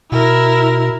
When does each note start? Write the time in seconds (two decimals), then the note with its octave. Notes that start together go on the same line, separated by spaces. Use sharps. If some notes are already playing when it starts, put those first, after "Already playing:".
0.12 B2 E4 A#4